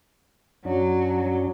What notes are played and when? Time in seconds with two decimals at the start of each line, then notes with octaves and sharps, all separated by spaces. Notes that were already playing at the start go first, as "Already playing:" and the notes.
0.65 F#2 F#3 C#4 D4